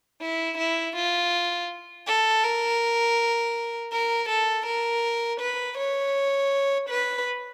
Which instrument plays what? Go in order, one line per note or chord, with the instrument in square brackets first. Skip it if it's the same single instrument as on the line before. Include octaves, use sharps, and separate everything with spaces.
[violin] E4
E4
F4
A4
A#4
A#4
A4
A#4
B4
C#5
B4